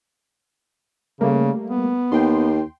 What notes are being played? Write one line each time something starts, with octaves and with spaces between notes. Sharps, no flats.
C#3 G3 A3 A#3
B3
D#2 G5 C6